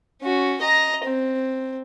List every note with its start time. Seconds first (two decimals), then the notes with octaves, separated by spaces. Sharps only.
0.22 C#4 F#4
0.61 D#5 A#5
1.04 C4